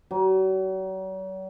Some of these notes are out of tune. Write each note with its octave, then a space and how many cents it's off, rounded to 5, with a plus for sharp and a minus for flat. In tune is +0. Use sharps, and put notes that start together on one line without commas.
F#3 +40